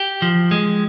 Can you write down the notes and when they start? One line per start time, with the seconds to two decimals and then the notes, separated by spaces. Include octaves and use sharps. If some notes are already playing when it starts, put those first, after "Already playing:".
Already playing: G4
0.22 F3
0.51 G#3